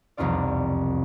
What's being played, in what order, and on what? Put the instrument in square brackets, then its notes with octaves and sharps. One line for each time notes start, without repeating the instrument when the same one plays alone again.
[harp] E1 C2 F2 D#4 F4 D5